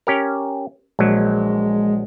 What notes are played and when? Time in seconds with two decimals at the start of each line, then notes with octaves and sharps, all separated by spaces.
0.07 C#4 G4 A#4
0.99 A#1 F#3 G#3